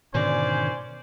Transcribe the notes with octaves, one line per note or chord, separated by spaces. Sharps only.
G#2 B2 D3 D#3 C#4 C5 D5 G#5